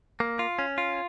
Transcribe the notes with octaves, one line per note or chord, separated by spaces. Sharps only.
A#3
F4
C#4
F4